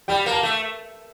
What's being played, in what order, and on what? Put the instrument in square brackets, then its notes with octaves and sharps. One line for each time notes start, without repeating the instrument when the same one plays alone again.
[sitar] G3 [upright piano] G5
[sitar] A#3
[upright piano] A5
[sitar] A3